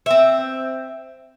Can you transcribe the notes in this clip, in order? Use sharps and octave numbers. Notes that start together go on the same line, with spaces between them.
C4 E5